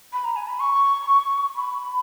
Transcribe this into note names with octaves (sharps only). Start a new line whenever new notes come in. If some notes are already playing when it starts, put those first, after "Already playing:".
B5
A#5
G#5
B5
C#6
B5